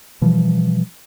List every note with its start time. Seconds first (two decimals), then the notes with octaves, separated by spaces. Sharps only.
0.21 B2 E3 F3 G3